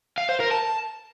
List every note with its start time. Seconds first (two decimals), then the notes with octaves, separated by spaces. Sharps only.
0.18 F5
0.29 C5
0.40 A#4
0.51 A5